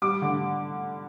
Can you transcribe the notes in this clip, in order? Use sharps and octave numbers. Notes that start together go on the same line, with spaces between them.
G3 D6
D3